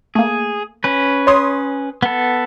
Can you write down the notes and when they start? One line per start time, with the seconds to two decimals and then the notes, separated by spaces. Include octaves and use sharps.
0.15 A3 A#3 G#4
0.84 C#4 B4
1.27 C#5 C6 D#6
2.03 B3 A4